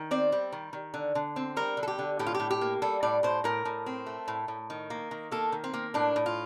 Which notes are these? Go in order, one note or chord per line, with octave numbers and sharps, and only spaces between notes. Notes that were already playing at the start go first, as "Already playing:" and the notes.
Already playing: D#3
C4 D5
G3
D#3
D#3
D3
D3
C4
G3 A#4
D3
A4
G4
D3
A2 G4
F4
G4
A2
G4
A#3
G3 A4
A2 D5
A2 C5
A2 A#4
A2
C4
A3
A2
A2
D#3
A#3
D#3
A#3 A4
D#3
C4
A#3
A2 D4
A2
F4